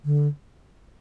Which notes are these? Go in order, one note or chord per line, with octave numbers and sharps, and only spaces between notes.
D3